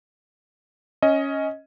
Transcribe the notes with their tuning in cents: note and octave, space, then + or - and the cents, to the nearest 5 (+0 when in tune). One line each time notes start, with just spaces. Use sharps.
C#4 +0 D#5 +15